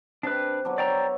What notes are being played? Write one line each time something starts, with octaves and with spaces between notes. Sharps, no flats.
C3 D4 B4
F#3 B3 D4
C#5 D5 E5 G5 A#5